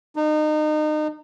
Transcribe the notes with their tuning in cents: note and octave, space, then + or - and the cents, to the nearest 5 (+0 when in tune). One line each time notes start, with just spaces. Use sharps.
D#4 -30